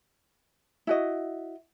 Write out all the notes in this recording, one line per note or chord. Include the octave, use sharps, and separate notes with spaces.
E4 F#4 D#5